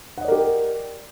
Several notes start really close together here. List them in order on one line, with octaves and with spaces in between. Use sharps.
F#5 D#5 D5 A#4 G4